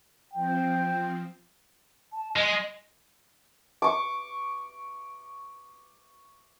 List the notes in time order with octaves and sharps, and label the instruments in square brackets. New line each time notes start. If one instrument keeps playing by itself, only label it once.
[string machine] F3 C4 [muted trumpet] G5
[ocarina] A5
[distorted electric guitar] G#3 [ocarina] D#5
[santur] C#6 D6